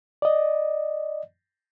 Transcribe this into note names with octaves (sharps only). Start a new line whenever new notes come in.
D5 D#5